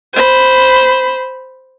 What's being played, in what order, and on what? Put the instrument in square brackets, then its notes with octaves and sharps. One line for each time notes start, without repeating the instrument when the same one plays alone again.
[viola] C5 B5